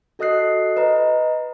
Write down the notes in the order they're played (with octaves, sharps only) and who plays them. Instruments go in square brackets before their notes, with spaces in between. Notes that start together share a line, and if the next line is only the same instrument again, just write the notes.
[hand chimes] F#4 A4 D#5 D#6 F#6 C7
B4 D#5 A#5